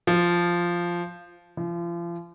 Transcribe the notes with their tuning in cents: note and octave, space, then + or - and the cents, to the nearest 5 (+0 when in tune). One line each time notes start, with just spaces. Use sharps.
F3 -5
F3 -35